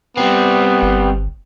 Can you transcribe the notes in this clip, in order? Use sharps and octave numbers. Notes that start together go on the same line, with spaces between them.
G3 B3 C4
G1